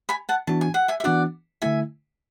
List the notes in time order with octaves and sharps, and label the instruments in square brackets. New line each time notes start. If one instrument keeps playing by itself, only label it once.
[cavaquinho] G#5 B5
F#5 A5
[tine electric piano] E3 B3 D4 F#4 [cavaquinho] A5
[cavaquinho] G#5
F#5
E5 G#5
E5
[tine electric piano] E3 B3 D4 F#4 [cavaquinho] D5 F#5
[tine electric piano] D3 A3 E4 [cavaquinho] E5 G#5